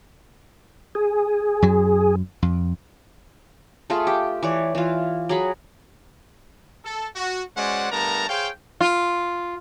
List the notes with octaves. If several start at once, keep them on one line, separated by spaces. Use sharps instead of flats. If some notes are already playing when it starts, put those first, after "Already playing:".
G#4
F#2 F#3
F2
A3 F4 G#4
G4
E3 C#5 D5
E3 F4
F#3 G#4 B5
A4
F#4
G#3 C#4 F#4 C5 D5 F#5
G2 A3 B3 A#4 A5 A#5
G#4 C5 C#5 F5 G5
F4